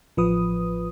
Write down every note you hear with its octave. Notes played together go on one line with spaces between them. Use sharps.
A1 F3 B4 D#6